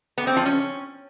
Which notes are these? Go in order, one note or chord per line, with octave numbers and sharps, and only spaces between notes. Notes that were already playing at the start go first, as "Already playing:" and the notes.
B3
C4
F3
C#4